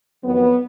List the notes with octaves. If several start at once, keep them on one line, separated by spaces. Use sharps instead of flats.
F2 D#3 F#3 B3